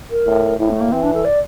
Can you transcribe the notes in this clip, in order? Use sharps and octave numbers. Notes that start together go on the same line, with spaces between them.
A#4
A2
A2 E4
A3
A#3
E3 C4
D4
A4
D5